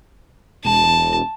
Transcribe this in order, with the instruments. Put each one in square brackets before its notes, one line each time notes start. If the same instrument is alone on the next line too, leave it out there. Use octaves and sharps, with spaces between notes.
[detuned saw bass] E1 [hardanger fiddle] A5